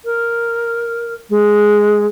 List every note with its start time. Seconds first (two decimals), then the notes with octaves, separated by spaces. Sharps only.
0.05 A#4
1.30 G#3